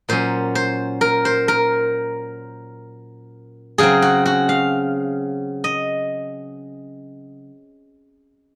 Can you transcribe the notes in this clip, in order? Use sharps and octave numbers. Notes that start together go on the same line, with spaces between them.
A#2 F#3 C#4 C5
C5
A#4
C5
A#4
C#3 F#3 C4 G#4
F#4
F#4
F5
D#5